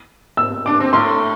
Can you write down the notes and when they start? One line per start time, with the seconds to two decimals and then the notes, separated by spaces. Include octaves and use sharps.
0.37 E6
0.66 D4 D6
0.80 C4
0.93 A2 A3 C6